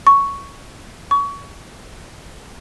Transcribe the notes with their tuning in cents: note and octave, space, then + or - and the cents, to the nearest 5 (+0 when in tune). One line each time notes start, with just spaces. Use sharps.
C#6 +5
C#6 +25